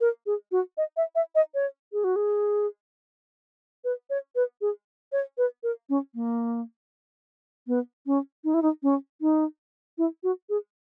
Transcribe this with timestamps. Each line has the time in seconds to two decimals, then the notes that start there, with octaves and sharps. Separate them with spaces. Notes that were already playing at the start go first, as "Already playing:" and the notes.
0.01 A#4
0.26 G#4
0.52 F#4
0.77 D#5
0.97 E5
1.15 E5
1.35 D#5
1.54 C#5
1.93 G#4
2.04 F#4
2.16 G#4
3.84 B4
4.10 C#5
4.36 B4
4.61 G#4
5.12 C#5
5.38 B4
5.63 A#4
5.89 C#4
6.15 A#3
7.67 B3
8.06 C#4
8.44 D#4
8.54 E4
8.62 D#4
8.83 C#4
9.21 D#4
9.98 E4
10.23 F#4
10.49 G#4